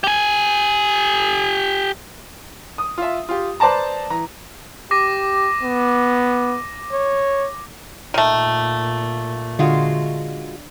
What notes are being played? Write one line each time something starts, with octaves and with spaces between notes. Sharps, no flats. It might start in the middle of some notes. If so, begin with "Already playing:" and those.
G4 G#5
D#6
F4 E5
F4 G4
B4 C5 D5 A5 A#5
E3 A#5
G4 D6 A#6 D#7
B3
C#5
A#2 D#3 A3
D3 G#3 F4 F#4